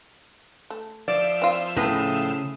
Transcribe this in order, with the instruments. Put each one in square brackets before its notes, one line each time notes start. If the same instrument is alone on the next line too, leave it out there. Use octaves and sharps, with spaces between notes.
[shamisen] A3
[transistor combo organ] F3 E5 [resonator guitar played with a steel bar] D5
[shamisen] C4 F4
[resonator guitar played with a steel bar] A2 [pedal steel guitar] C#3 G#4 [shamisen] B3